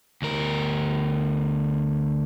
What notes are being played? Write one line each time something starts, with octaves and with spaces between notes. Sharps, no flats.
D2 A#4